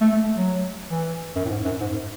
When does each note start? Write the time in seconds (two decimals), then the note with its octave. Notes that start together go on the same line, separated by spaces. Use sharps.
0.01 A3
0.12 A3
0.23 A3
0.35 F#3
0.90 E3
1.36 F#2
1.45 A2
1.50 G#2
1.65 F#2
1.81 G#2